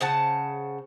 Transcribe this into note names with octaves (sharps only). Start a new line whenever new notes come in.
C#3 C5 F#5 A5